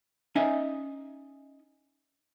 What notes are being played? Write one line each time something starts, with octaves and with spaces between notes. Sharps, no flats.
C#4 D#4 D#5 E5 G#5